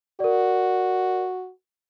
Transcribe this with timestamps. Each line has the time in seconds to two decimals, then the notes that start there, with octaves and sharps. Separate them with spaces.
0.20 F#4 A#4 D5